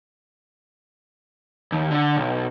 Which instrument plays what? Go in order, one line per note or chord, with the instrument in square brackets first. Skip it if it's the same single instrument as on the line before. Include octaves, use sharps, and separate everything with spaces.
[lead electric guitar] D#2
D3
B1